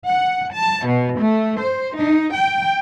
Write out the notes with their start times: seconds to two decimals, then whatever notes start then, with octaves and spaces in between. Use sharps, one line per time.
0.10 F#5
0.54 A5
0.87 B2
1.19 A3
1.61 C5
1.97 D#4
2.34 G5